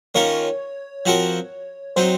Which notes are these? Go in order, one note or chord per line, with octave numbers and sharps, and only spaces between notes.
D#3 A#3 C#4 F4 A#4 C#5
F3 C4 F#4 A#4 C#5
F#3 C4 D#4 C5